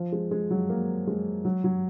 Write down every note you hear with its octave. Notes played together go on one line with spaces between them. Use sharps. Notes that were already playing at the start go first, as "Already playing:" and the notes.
Already playing: F3
G#3
G#3
F#3
A#3
G#3
F#3
F#3